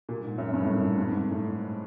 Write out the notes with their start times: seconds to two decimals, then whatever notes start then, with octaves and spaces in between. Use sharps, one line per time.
0.09 A#2
0.23 G#2
0.38 F#2
0.53 G2
0.65 A2
0.76 A2
0.87 G#2
0.98 G2
1.08 G#2
1.31 A2